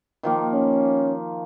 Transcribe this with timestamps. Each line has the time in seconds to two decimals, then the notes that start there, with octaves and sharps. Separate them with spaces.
0.23 D#3 F3 A#3
0.54 C#4